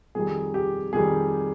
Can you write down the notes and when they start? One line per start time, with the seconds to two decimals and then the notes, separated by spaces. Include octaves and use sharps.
0.15 F2 D#3 G3 G#4
0.54 G4
0.93 F2 D#3 G3 G#4